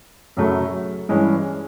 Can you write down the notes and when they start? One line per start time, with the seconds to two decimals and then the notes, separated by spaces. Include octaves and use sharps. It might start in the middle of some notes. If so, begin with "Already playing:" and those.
0.37 F#2 C#3 F#3 A3
1.09 G2 E3 G#3 C#4